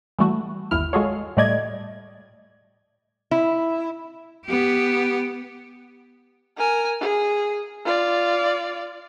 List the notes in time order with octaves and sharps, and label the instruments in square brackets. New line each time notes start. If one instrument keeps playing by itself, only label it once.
[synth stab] E3 G3 A3 F#4
G1 D#2 E4 F6
G#3 F4 F#4 G#4 A4 C#5
A2 G3 A3 D5 D#5 G#6
[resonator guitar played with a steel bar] E4
[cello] B3 G4
[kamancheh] A#4 G#5
G#4
F4 D5